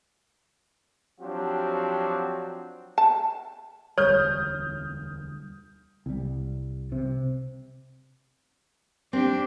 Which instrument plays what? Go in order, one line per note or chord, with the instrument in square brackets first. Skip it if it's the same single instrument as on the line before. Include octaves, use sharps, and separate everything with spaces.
[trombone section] F3 F#3 C4 D4 F#4 G4
[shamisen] A5
[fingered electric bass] E1 D2 G3 [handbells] C#5 [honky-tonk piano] D#6 F6 G6
[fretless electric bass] C2 G3
C3
[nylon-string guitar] C4 [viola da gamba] D4 G4